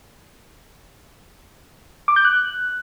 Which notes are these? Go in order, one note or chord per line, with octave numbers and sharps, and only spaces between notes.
D6
G6
F#6